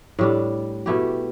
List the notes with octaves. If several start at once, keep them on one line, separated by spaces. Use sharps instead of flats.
A2 G3 D4
B2 A3 E4 G4